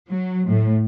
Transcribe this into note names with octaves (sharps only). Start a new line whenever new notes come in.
F#3
A2